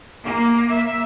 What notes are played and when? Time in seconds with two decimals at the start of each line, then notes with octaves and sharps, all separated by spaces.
0.23 A#3
0.71 E5